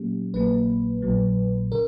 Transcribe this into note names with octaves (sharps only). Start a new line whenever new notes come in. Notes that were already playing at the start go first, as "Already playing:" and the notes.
Already playing: A#2 F#3 A#3 C#4 G4
A#1 A#2 F#3 A#3 B4
A#1 A#2 F#3
C#3 A#4